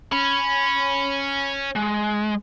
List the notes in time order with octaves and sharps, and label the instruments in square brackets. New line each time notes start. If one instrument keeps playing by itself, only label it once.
[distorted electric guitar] C#4 [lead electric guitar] B5
[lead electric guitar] G#3